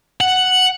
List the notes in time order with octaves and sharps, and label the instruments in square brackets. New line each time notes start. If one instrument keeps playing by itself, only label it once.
[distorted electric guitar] F#5